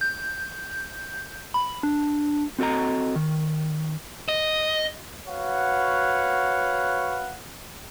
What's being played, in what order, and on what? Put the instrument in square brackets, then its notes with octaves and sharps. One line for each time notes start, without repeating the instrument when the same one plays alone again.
[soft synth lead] G6
B5
D4
[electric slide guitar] C4 F#4 A4 D#5 A#5
D#3
[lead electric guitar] D#5
[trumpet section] F#4 B4 C#5 F5 F#5